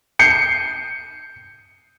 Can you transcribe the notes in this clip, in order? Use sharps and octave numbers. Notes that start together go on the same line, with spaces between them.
G6 C7 C#7